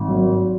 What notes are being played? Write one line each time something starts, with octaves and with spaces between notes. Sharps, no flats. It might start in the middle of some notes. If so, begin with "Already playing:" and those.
Already playing: G#1
F#3